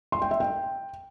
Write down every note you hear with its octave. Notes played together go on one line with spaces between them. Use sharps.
C6
G5
E5
G5